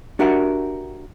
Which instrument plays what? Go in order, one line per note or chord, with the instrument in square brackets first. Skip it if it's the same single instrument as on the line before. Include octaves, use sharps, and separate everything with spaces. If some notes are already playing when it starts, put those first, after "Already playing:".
[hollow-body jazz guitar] D4 F#4 G4 A#4 E5 F#5